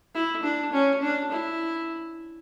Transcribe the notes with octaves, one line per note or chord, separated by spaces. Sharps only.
E4
D4
C#4
D4
E4